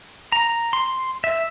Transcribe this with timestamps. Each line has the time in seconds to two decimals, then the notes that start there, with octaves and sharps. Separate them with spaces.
0.32 A#5
0.73 C6
1.24 E5